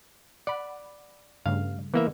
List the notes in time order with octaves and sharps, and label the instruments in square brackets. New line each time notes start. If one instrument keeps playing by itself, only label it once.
[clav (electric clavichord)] D5 [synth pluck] F#5 B5
[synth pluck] G2 C#3 A3 [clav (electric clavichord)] F5
[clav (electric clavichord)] E3 A#3 E5 [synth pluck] B3